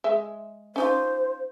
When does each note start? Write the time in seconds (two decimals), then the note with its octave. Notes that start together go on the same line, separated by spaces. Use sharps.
0.04 G#3 E5
0.76 C#4 D#4 F4 C5